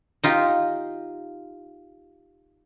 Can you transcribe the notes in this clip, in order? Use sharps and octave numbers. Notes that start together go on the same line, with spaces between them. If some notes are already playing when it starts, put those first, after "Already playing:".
D#4 F4 G4